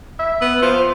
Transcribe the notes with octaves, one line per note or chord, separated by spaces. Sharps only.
E5
B3
F3 F4